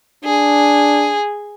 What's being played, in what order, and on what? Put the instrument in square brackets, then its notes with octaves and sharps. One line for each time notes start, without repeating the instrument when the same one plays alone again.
[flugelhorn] D4 [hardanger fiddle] G#4